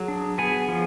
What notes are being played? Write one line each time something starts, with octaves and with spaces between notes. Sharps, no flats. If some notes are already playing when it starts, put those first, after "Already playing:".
Already playing: F#3 G#4
D4
B3 G#4 G#5
F3